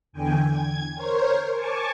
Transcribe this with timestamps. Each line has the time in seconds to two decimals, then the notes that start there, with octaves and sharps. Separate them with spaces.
0.13 E2 D3 G5 G#5
0.46 G#6
0.95 A#4 C5 C#5
1.53 G#5 A5 C#6 D6